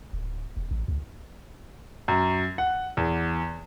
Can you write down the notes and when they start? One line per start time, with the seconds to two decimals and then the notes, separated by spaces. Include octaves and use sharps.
0.13 D1
0.57 E1
0.71 A1
0.88 C#2
2.08 F#2
2.58 F#5
2.97 E2